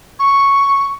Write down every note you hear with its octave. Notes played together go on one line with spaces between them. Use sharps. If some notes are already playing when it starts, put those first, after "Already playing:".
C#6